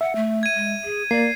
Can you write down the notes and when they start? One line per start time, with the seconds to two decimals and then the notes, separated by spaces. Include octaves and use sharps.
0.01 E5 F#5
0.16 A3
0.43 G#6 D#7
0.55 G#3
0.84 G#4
1.11 A#3 D5 C7